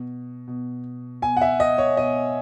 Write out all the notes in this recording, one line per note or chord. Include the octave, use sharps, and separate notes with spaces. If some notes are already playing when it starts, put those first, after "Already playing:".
Already playing: B2
B2
B2 G#5
F#5
E5
D#5
C#5
B2 D#5